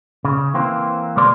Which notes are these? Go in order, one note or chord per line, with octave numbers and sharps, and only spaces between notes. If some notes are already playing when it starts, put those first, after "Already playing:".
C#3
E3 A#3 C4
D2 B2 G#3 A#3 D5 C6